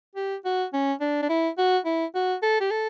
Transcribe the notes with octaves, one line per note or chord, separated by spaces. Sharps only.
G4
F#4
C#4
D4
D4
E4
F#4
E4
F#4
A4
G4
A4